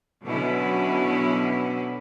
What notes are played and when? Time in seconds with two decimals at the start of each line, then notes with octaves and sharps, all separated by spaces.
0.24 B2 D3 F#3 C#4 E4